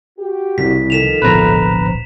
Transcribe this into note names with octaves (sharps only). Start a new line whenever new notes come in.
F#4 G4
C2 B6
D#3 F3 A4 B6 E7 F7
D1 A#1 B2 B4 C5 A#5